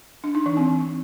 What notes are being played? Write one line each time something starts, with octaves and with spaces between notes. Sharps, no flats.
D4
D#4
E3
C4